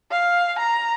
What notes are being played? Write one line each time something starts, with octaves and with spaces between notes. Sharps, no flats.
F5
A#5